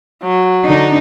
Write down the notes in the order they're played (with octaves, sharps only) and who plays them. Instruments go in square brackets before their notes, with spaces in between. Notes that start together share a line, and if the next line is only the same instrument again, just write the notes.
[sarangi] F#3
[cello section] D3 D4 D#4